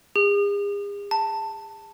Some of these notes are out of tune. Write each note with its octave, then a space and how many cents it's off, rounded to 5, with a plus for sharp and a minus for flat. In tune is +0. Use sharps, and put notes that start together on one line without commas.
G#4 -40
A5 +15